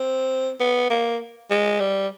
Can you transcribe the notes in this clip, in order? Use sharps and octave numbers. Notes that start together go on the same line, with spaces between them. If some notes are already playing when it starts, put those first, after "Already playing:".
Already playing: C4
B3
A#3
G#3
G3